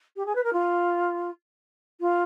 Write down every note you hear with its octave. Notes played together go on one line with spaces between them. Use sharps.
G4
G#4
B4
A#4
F4
F4